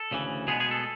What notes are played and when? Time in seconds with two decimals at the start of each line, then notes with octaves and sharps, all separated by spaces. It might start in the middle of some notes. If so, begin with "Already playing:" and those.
Already playing: A4
0.11 D2 C#3 E3
0.47 B2 G#3 B3 G#4
0.60 G#4
0.71 A4